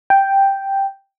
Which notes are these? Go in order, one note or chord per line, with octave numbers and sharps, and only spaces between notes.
G5